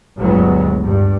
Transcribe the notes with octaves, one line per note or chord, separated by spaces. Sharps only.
G1 D2 F#3 G#3 B3
G2